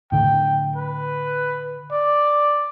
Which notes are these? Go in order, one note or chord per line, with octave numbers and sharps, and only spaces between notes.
A2 D3 G5
B4
D5